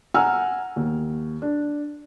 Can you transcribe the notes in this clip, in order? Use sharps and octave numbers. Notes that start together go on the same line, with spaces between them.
F#5 G#5 A#5 E6 F6
D#2
D4